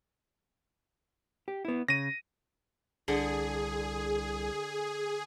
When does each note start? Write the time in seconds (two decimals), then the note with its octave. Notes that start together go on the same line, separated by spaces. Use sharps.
1.48 G4
1.65 B3 E4
1.88 C#3 A#6 D#7
3.08 C2 D3 G#4